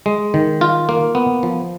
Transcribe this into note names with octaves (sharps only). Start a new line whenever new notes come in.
G#3
D#3
F4
A#3
B3
F3